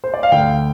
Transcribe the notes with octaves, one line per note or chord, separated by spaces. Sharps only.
C5
D5
F5
D2 G5